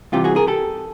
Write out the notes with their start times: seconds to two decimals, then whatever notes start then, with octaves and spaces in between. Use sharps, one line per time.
0.12 C2 C3 E3 F4 G4
0.24 F#4 G#4
0.36 G#4 A#4
0.47 G4 A4